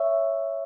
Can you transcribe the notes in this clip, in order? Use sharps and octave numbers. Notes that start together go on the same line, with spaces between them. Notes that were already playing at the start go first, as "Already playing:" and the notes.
Already playing: C#5 E5